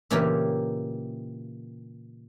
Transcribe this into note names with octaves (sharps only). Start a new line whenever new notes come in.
A#2 C#3 E3 E4 G4 A#4